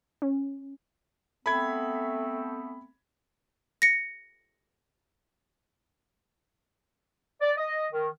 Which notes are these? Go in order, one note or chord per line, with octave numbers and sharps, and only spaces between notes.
C#4
A3 B3 C4 B5 G#6
A#6 C#7
D5
D#5
D#3